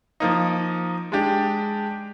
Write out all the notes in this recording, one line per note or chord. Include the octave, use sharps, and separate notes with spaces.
F3 A#3 D#4
G#3 D4 G4